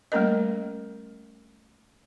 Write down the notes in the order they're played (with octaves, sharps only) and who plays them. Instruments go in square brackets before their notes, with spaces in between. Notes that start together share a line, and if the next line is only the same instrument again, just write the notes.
[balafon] G3 A3 A#3 C#4 A#4 D#5